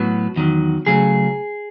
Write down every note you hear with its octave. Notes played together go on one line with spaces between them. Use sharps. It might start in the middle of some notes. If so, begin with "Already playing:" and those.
Already playing: A2 F#3 B3 F#4
E2 D#3 F#3
C#3 F#3 A3 C#4 G#4